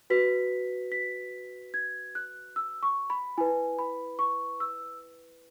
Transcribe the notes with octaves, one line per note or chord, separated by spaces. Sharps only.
F#4 B4 B6
B6
G#6
F#6
E6
C#6
B5
E4 B4 G#5
B5
C#6
E6